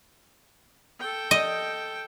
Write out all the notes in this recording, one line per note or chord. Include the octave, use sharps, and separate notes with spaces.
A4 G5
D#5